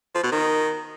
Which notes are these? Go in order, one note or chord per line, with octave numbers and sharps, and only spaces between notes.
F3
B2
D#3